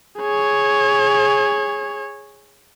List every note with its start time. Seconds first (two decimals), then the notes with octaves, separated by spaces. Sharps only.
0.20 G#4 C#5